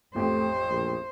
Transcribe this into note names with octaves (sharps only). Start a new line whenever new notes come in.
A1 F2 A3 G4 C5
A#1